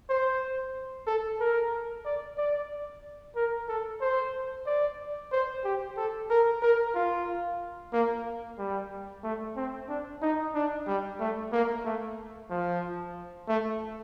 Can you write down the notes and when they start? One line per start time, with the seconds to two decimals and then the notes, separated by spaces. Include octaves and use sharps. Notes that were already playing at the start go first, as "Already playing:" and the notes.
0.10 C5
1.07 A4
1.40 A#4
2.05 D5
2.38 D5
3.36 A#4
3.68 A4
4.01 C5
4.67 D5
5.32 C5
5.65 G4
5.97 A4
6.30 A#4
6.63 A#4
6.95 F4
7.93 A#3
8.59 G3
9.24 A3
9.56 C4
9.89 D4
10.22 D#4
10.55 D4
10.87 G3
11.20 A3
11.52 A#3
11.85 A3
12.50 F3
13.48 A3